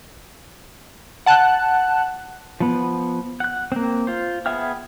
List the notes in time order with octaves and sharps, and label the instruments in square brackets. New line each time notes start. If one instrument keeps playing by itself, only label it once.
[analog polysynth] F#5 A5 F#6
[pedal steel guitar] F3 B3
F#5 F#6
A#3 C4
F4 C5
B3 G#4 E5 G5 F6